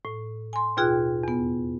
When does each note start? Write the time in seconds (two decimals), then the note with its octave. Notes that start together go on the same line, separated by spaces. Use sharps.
0.05 A2
0.53 G#5 C6
0.77 D#2 B2 F4 G#4 G5 F#6
1.23 E2 B3